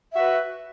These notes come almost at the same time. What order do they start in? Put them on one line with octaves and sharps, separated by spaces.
E5 F#4 B4